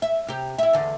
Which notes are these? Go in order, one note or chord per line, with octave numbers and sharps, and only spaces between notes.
E5
C3 G4
E4 E5
E2 D3